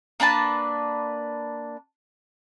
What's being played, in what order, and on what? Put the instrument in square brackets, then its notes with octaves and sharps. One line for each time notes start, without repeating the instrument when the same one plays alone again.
[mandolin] A#3 D4 B4 A5